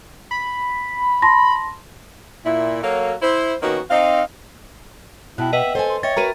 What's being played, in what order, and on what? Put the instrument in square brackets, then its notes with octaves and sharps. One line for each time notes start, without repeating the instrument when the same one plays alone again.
[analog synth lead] B5
[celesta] A5 C6 A#6
[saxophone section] A#2 E4
F#3 A#3 F#4 A4 C#5 F5
E4 C5
D#3 A#3 B3 C#4 D#4 F#4
C4 D#4 F5
[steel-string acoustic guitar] B2 [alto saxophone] E4 [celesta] G5 A5 F#6
[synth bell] B4 D#5 [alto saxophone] E5 [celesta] F#5 G5
[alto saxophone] A4 [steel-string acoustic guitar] C5 G#5
[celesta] C6
[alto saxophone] C#5 [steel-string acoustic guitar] D#5 [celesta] E5 G5 G#6 [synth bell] A6
[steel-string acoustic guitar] F#4 A#4 B4 [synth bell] A#5 D#7